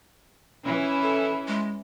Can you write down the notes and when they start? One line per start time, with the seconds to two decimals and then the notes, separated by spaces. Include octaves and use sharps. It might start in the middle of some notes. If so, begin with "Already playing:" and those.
0.65 E3 C#4 E4
1.02 A4
1.47 G#3